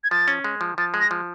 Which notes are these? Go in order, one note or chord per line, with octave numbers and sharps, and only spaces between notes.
G#6
F3 A6
C#4
G#3
F3
F3 A6
G#3
A#6
F3